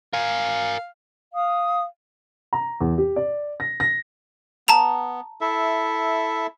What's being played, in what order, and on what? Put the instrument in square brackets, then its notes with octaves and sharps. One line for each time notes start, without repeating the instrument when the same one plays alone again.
[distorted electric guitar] A#4 G#5 [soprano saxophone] F5
[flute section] F5 D#6
[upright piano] A#5
E2
G4
D5
A#6
A#6
[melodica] B3 [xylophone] A5 A#5 F7
[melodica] E4 A4 E5